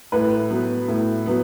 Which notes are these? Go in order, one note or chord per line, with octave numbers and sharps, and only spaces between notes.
A2 B4
F#3 B3
A2
F#3 B3